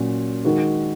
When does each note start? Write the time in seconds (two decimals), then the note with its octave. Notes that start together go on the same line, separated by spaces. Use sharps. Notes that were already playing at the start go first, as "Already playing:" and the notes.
Already playing: A#2 F#3 C#4
0.45 D#3 G#3 D#4 F#4 A#4